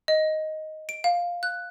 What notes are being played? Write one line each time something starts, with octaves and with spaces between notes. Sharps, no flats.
D#5
D7
F5
F#6